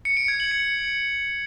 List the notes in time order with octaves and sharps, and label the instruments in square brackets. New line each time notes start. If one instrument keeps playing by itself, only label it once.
[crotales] C#7
D7
G#6
F#7
C#7